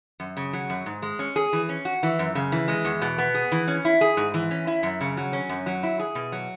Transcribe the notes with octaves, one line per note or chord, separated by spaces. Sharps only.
F#2
C#3
F#3
F#2
G#2
G#3
C#4
G#4
E3
C#4
F#4
E3
F#2
C#3
E3
G#3
E2
B2
B3
G#4
E3
C#4
E4
G#4
G#2
E3
C#4
E4
F#2
C#3
F#3
C#4
F#2
F#3
E4
G#4
B2
F#3